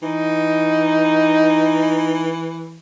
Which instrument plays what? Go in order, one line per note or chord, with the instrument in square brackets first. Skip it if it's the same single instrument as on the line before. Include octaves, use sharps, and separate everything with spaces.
[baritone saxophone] E3 [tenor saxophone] D#4